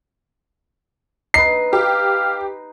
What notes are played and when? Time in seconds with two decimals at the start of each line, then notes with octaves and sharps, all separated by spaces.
1.34 D#4 B4 C7
1.73 G4 F5